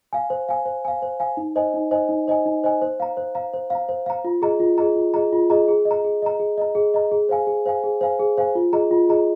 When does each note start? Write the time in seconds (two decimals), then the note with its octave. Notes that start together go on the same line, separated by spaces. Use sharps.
0.13 F5 G#5
0.30 C5
0.49 F5 G#5
0.66 C5
0.85 F5 G#5
1.02 C5
1.20 F5 G#5
1.37 D#4
1.56 C5 D#5 G#5
1.74 D#4
1.91 C5 D#5 G#5
2.09 D#4
2.28 C5 D#5 G#5
2.46 D#4
2.64 C5 D#5 G#5
2.82 C5
3.00 F5 A#5
3.17 C5
3.35 F5 A#5
3.53 C5
3.70 F5 A#5
3.89 C5
4.06 F5 A#5
4.25 F4
4.42 G#4 D#5 A#5
4.60 F4
4.78 G#4 D#5 A#5
4.96 F4
5.14 G#4 D#5 A#5
5.32 F4
5.50 G#4 D#5 A#5
5.68 G#4
5.85 D#5
5.91 A#5
6.04 G#4
6.22 D#5 A#5
6.40 G#4
6.58 D#5 A#5
6.75 G#4
6.94 D#5 A#5
7.12 G#4
7.29 C5 F5 G#5
7.47 G#4
7.66 C5 F5 G#5
7.84 G#4
8.01 C5 F5 G#5
8.19 G#4
8.37 C5 F5 G#5
8.55 F4
8.73 G#4 D#5 A#5
8.91 F4
9.09 G#4 D#5 A#5